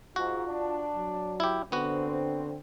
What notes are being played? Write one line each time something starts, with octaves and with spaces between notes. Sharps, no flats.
G#2 F4 F#4
D4
F#3
E4 G4
D3 B3 C4 F#4